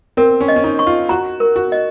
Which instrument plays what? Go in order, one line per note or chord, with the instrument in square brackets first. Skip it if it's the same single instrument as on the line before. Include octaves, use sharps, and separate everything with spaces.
[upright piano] C4 [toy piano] A#4
[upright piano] C#4
[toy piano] D#5
[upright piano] C#4
D#4
[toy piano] C#6
[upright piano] F4
[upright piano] F#4 [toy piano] A#5
[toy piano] A#4
[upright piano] F#4
[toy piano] D#5